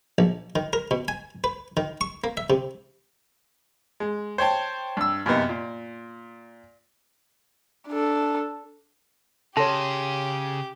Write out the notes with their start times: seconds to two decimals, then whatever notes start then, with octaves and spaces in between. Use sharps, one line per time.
0.18 A#1
0.56 D#3
0.73 A#4
0.91 B2
1.08 G#5
1.44 B4
1.77 D#3
2.01 C#6
2.24 A#3
2.37 E5
2.50 C3
4.00 G#3
4.38 C5 C#5 G5 A5
4.97 G2 E6
5.26 F#2 C3 A#3 B3 D#4
5.49 A#2
7.88 D4 A4
9.57 C#3 G4 A4 C#5 C6 A#6